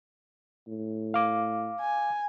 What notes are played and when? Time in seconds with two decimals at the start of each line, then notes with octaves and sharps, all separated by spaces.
0.68 A2
1.14 F5 D6
1.80 G#5